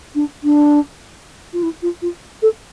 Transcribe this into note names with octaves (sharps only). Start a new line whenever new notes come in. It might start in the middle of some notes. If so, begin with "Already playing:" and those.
D4
D4
F4
E4
F4
F4
A4